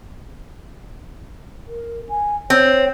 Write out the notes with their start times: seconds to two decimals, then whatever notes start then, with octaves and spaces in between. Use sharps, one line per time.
1.68 A#4
2.09 G#5
2.50 C4 C#5